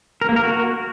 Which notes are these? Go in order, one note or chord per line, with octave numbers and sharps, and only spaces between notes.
A#4
A#3
A#4
F#4